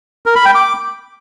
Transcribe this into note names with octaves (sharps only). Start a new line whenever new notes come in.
A#4
B5
G5
D6